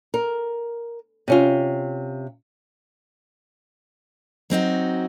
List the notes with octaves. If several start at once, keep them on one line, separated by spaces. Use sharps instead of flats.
A#4
C3 C#4 F4
F#3 C4 D#4 F#4